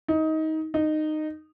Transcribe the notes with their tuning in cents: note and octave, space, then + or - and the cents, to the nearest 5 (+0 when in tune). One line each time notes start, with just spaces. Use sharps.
D#4 +20
D#4 -15